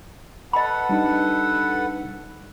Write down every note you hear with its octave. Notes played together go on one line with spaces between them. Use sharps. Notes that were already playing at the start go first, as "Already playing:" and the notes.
A4 B4 D#5 F#5 B5
G3 D4 D#4